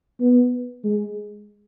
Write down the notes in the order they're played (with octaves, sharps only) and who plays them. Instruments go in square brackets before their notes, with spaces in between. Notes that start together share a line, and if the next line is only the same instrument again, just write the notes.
[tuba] B3
G#3